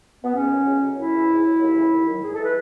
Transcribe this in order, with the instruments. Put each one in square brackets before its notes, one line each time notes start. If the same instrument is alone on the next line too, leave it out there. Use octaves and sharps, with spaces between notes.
[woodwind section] B3
G#2 C#4
D#3 F#3
C#2
C#3 F#3
F#2 E4
C#3 E3
G#2
F#3
D#2
C#3 E3
D#2
D#3 F#3
G#2 G#4
A4
E3
B4